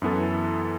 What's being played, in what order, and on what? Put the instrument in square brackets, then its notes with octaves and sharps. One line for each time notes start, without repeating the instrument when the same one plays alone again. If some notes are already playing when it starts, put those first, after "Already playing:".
[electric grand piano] F#2 E3 B3 E4 A4